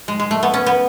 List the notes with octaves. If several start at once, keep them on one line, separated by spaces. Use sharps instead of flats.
G#3
G#3
A3
B3
C#4
B3